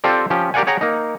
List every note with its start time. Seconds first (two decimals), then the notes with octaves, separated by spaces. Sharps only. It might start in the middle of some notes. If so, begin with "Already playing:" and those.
0.04 C4 F4 G4 A4 C5 D5
0.30 F3 C#4 G4
0.54 G4 A#4 D5 F5 F#5 G#5
0.67 G#4 C#5 F#5 G5 A#5
0.81 A#3 D#4